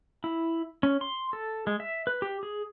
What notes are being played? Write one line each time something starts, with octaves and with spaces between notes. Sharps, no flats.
E4
C#4
C6
A4
G#3
E5
B4
G4
G#4